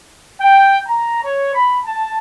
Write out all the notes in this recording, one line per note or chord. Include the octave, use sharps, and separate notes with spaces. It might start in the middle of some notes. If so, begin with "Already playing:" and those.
G5
A#5
C#5
B5
A5